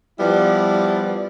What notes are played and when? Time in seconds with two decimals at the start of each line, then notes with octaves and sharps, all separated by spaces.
0.19 F3 G3 B3 E4 D5